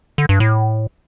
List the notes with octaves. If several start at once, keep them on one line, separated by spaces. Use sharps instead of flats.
D3
G2
A2